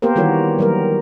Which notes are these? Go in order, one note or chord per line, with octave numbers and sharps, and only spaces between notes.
A#3 B3 G4 A#4 C5
D#3 E3 G3 F#4 A#4 C#5
F#3 G3 A#4